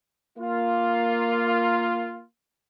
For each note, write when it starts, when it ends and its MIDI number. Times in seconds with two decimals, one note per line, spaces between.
0.38 2.22 58
0.38 2.22 65